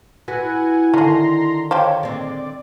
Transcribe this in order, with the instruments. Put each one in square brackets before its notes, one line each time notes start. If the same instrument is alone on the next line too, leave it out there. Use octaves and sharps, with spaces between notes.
[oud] E4 F#4 B4 [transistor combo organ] F#5 G#5
[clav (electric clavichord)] D3 D#3 [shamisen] A3 G#4 [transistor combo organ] A#5 C6
[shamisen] F3 G4 [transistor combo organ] C#5
[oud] G#3 C4 [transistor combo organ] D5